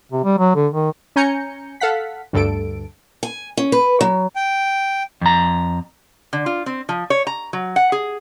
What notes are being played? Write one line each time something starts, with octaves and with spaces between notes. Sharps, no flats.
C3
G3
F#3
D3
D#3
C#4 G#5 A#5 G6 C#7
A4 F5 F#5 B6
D2 G2 A4 D7
G#5
C#4
B4
F#3
G5
F2 A#5
D3
F4
C4
F3
C#5
A#5
F#3
F#5
G#4